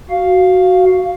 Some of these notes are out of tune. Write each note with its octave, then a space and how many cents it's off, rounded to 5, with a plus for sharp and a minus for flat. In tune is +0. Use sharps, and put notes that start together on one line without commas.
F#4 +5 F5 +0